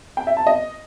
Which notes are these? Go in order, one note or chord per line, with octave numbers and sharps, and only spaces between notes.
G5
E5
A5
D#5